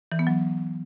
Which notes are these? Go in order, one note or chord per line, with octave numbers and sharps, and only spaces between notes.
E3
B3
F#3